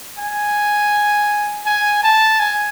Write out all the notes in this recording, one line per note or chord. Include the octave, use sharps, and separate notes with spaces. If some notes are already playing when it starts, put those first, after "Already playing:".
G#5
G#5
A5
G#5